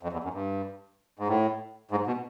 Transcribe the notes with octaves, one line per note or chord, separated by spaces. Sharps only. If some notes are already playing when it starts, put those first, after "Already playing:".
F2
E2
F#2
G2
G#2
A2
G#2
B2